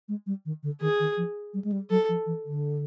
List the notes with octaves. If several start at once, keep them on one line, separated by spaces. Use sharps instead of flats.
G#3
G3
D#3
D3
D#3 G#4
D#3
F3
G3
G#3
G3
F#3 A4
F3
E3
D3